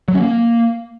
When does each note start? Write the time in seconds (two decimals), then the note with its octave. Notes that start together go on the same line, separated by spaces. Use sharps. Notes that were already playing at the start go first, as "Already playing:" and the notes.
0.08 F#3
0.14 C#4
0.20 A#3